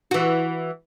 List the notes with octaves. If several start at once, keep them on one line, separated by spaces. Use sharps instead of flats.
E3 F#4